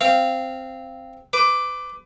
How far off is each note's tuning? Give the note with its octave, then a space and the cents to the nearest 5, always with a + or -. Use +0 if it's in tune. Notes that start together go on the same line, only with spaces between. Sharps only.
C4 +0 F5 -15
B4 +35 D6 +0